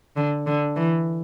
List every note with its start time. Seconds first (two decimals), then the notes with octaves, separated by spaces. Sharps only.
0.16 D3
0.47 D3
0.76 E3